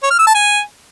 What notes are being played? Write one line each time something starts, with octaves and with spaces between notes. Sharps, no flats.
C#5
F6
E6
A5
G#5